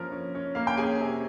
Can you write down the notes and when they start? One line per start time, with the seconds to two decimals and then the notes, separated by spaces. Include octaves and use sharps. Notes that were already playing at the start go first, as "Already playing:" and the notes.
Already playing: F3 A#3 C#4 A#4 A#5
0.12 C#4
0.35 C#4
0.55 A#3 F5
0.67 G5
0.77 C#4 G#4 G#5
1.00 C3